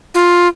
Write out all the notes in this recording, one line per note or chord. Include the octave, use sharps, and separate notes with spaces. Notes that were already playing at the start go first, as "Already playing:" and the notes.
F4